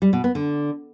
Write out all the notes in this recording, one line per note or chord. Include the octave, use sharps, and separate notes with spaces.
G3
B2
B3
D3